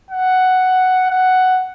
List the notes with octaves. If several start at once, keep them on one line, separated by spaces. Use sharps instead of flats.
F#5
F#5